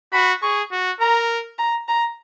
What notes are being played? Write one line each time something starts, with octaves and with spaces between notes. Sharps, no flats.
F#4 B5
G#4 C#6
F#4
A#4 A#5
A#5
A#5